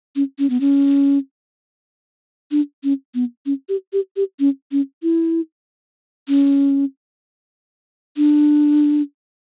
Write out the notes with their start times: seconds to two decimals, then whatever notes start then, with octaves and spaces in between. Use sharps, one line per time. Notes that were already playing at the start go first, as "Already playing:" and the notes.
0.16 C#4
0.39 C#4
0.50 B3
0.60 C#4
2.51 D4
2.83 C#4
3.14 B3
3.46 C#4
3.69 G4
3.93 G4
4.16 G4
4.39 C#4
4.71 C#4
5.03 E4
6.28 C#4
8.17 D4